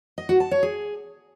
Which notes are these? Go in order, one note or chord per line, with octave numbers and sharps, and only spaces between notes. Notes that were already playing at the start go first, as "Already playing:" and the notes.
D#5
F#4
A5
C#5
G#4